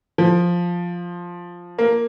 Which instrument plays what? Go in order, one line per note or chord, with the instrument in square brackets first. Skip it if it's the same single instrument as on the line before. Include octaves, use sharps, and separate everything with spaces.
[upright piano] F3
A#3